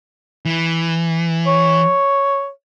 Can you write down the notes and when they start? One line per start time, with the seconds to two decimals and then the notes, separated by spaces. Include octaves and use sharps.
0.45 E3
1.47 C#5